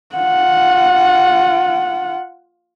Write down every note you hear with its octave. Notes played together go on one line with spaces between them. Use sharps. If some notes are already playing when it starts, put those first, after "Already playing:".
F4 F#5